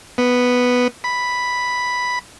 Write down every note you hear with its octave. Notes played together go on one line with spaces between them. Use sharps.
B3
B5